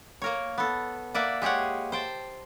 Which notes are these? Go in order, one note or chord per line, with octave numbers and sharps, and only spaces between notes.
A#3 A#4 C#5
B3 A4
A#3 D5 E5 F#5
G#3 G4 G#4 C#5 F#5
C5 G5 A5